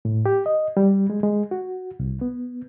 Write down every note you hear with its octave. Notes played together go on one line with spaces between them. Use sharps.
A2
G4
D#5
G3
G#3
G#3
F#4
C2
B3